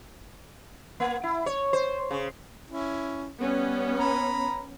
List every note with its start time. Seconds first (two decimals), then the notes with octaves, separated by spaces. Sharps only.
1.00 A#3
1.23 E4
1.46 C#5
1.73 C5
2.11 C#3
2.71 C#4 E4
3.39 G3 B3 C#4
3.99 A#5 B5